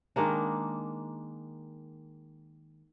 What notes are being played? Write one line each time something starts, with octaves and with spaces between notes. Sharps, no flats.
D#3 G#3 A#3 D4